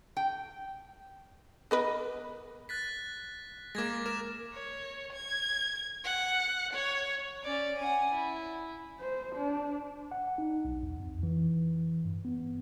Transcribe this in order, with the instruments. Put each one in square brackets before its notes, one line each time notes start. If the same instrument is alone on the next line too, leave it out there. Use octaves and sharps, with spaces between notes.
[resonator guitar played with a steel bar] G5
[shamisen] B3 A#4 B4 [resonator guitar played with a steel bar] D#5
[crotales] F#6 A6 B6
[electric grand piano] G#3 A#3 [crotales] D6 G#6 A#6
[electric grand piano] A#4 [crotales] E7
[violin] C#5
G#6
F#5
C#5
[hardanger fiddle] C#4 D5
F#5 G#5
E4
[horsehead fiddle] C5
D4
[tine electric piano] F#5
D#4
B1
E2
F2
E3
G2
B3